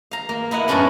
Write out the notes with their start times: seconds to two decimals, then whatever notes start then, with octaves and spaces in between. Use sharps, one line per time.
0.11 F5 A#5
0.29 A#3
0.51 A#3 E4 D#5 F#5
0.68 F#2 A2 B3 C#4 D4 E4